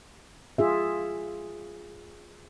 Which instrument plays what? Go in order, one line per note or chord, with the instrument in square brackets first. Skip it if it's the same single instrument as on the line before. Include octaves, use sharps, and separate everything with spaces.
[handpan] F4 G#4 E5